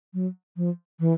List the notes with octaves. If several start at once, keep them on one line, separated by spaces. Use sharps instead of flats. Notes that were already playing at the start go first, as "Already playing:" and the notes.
F#3
F3
E3